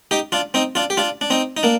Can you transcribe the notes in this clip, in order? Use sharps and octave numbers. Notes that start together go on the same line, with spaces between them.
D#4 G4
D4 F4
C4 D#4
D4 F4
G4
D4 F4
D4
C4 D#4
D#4
A#3 D4